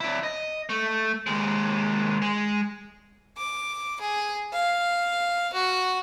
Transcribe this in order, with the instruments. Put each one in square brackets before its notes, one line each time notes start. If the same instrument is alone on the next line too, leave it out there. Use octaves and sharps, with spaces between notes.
[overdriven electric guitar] D4 E4
D#5
A3
D#2 G#3
G#3
[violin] D6
G#4
F5
F#4